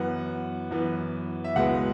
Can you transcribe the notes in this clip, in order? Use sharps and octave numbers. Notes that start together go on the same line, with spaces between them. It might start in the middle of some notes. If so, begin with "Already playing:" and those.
Already playing: F#2 E3 B3 F#5
F#2 E3 B3
E5
C#2 B2 G#3 B3 F#5